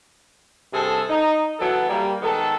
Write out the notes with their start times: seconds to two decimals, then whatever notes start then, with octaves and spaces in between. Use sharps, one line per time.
0.72 G2 C3 G#4 A4
1.08 D#4
1.59 E3 F#3 B3 A4
1.88 G3 A#3
2.21 D#3 G#3 B3 A4